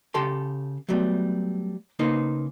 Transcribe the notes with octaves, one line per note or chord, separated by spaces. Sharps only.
C#3 G4 A4 A5 C6
F#3 G3 A3 B3
C#3 A#3 D#4 B4 C5